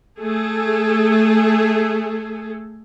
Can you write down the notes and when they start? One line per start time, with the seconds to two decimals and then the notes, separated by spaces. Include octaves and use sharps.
0.19 A3 G#4 A4